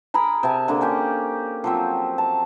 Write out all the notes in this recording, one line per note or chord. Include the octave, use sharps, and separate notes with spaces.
G#4 A#4 A#5 B5
C3 G#5 A5
D3 A#3
A#3 C#4 G4
F3 F#3 C4
A5